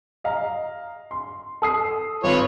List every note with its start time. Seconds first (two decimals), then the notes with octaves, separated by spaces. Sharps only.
0.24 D#5 F5 A#5
1.11 C6
1.62 A4 D#6 C7
2.24 G#1 F4 B4 C#5